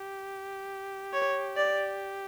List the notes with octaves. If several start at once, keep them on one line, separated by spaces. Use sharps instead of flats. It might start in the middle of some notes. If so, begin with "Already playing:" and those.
Already playing: G4
C#5
D5